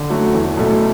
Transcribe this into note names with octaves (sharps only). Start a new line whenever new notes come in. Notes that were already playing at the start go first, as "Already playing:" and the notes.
Already playing: D3
F#3 A3 F#4
E2
B2 F#3 A3